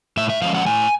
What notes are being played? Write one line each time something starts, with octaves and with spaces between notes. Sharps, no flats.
A2 E5
E5
F3 G#3 C#4 F5
F#5
A2 G#5